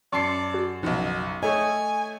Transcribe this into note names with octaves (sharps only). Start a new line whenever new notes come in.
F#2 D5 A5 C6 C7 C#7
F#4
F#1 B1 F3 D#4 F#4
A3 C#5 D#5 G#5